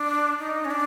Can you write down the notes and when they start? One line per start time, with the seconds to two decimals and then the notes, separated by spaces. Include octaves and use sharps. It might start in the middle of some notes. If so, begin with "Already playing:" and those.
Already playing: D4
0.39 D#4
0.65 C#4
0.71 D4